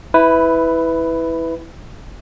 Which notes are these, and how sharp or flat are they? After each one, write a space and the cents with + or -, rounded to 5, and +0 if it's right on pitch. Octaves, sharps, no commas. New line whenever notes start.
E4 -10 B4 +10